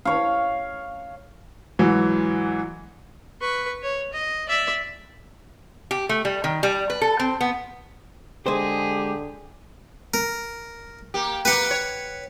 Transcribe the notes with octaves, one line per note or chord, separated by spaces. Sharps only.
C#5 F5
G#2 E3 F#3
B4 C#6
C#5
D#5
D5 E5
G4
A3
G3
D#3
G3
B4
A4
C4
B3
D3 G#3 G4 G#4 C5
A#4
A#3 G4
A#3 G4 B4 F#5
C#5